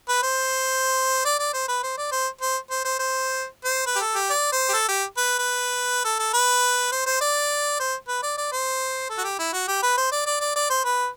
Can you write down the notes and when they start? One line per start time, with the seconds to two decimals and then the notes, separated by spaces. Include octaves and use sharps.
0.08 B4
0.23 C5
1.25 D5
1.39 D5
1.54 C5
1.68 B4
1.83 C5
1.97 D5
2.12 C5
2.41 C5
2.70 C5
2.85 C5
2.99 C5
3.65 C5
3.86 B4
3.96 G4
4.01 A4
4.15 G4
4.30 D5
4.52 C5
4.69 G4
4.73 A4
4.89 G4
5.17 B4
5.39 B4
6.04 A4
6.19 A4
6.33 B4
6.92 C5
7.06 C5
7.21 D5
7.80 C5
8.08 B4
8.23 D5
8.37 D5
8.52 C5
9.10 A4
9.18 F#4
9.24 G4
9.39 E4
9.53 F#4
9.68 G4
9.83 B4
9.97 C5
10.12 D5
10.26 D5
10.41 D5
10.56 D5
10.70 C5
10.84 B4